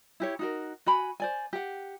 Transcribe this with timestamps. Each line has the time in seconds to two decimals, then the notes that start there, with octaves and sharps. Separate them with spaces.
0.20 E4 G4 C#5
0.39 D#4 F#4 A#4
0.86 F#4 G#5 B5
1.20 C5 D5 G#5
1.53 G4 F#5